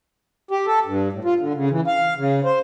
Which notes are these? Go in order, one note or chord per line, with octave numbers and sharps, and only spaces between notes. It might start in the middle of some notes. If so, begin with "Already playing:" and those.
G4
A4
G2
A2
F4
D3
C#3
E3
F5
C#3
C5